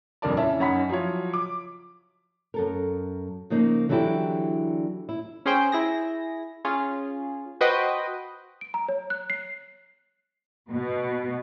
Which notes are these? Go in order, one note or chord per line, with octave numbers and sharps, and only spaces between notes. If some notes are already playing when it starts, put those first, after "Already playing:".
D#1 F2 D4 A#4 D5 A5
C#4 E4 E5 A5
F#2 C#4 D#4 F#5 B5 B6
F3 F#3 E4 F4 C#5
D6
F#2 A4 A#4
C#3 F3 A#3 D#4
D3 E3 F#3 D4 E4 G4
E4
C#4 G#4 C5 G5
E4 G#4 A#6
C#4 F4 G#4
F#4 B4 C5 D#5 G5
D7
A#5
C#5
F#6
C7
B2